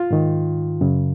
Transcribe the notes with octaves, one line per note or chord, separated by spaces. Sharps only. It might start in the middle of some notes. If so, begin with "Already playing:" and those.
Already playing: F4
G#2 D#3
F#2 C#3